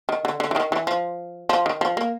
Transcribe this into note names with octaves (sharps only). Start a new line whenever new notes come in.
D#3
D3
D3
E3
D#3
E3
F3
F3
D#3
F3
A#3